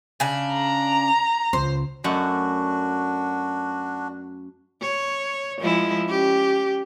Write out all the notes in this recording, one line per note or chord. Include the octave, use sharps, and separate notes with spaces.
C#3 D4
A#5
C#2 C5
F#2 A3 D4 F#4 F#5
C#5
F3 G#3 E4
C#4 G4